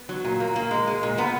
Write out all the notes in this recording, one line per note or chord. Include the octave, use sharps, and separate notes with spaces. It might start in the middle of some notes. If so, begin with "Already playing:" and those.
Already playing: B3
F#3
A#2
A#3
A#2 A#3
G#3
G#3
A#2
A#2 B3